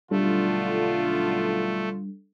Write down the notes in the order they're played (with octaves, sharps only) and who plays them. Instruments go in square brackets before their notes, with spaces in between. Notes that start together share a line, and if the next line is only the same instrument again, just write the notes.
[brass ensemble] B1 D3 F4 [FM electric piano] G3 D4 A4 [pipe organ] A3